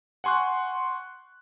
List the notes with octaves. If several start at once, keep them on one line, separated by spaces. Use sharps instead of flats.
F#5 G#5 C6 C#6 F#6